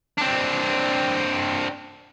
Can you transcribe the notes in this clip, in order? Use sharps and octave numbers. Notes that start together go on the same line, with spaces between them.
C4 D4